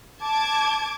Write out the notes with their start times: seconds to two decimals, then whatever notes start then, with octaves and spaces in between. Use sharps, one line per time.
0.24 A5 D6 G#6